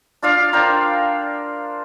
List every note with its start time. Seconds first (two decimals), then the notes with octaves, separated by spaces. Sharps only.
0.22 D4 F4 D5 F5
0.53 A#4 C5 D5 G5